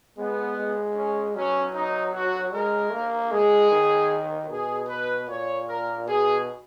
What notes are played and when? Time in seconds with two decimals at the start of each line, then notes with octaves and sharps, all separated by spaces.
0.17 G#3 B3
0.57 G#3
0.96 C#4
1.35 F#3 C#4
1.75 D#4
2.14 F#4
2.53 G#3 A#4
2.92 A#3
3.31 G#3 G#4
3.71 D#3
4.49 B2 G#4
4.88 B4
5.28 A#2 C#5
5.67 A#4
6.07 B2 G#4